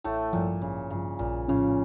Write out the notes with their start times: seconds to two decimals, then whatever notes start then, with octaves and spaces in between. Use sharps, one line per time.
0.04 A1 A2 A3
0.33 G2 A#2 F3
0.62 A1 C#3
0.90 G2 C#3 F3
1.19 A#1 A#2
1.48 A2 C#3 F3 C#4 F4